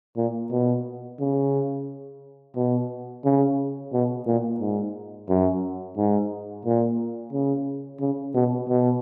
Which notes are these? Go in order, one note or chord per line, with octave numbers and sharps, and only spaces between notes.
A#2
B2
C#3
B2
C#3
B2
A#2
G#2
F#2
G#2
A#2
C#3
C#3
B2
B2